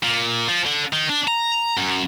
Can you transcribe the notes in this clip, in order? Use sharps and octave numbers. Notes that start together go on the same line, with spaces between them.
A#2
F3
D3
D#3
D4
A#5
F#2